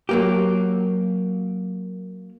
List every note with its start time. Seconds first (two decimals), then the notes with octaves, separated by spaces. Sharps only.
0.09 F#3 A#3 G4